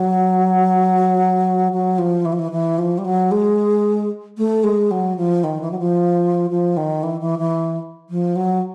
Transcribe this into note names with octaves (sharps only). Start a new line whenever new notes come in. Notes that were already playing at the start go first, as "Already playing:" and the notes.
Already playing: F#3
F#3
F3
E3
F3
E3
E3
F3
G3
F#3
G#3
A3
G#3
F#3
F3
D#3
E3
F#3
F3
F3
D#3
E3
E3
E3
F3
F#3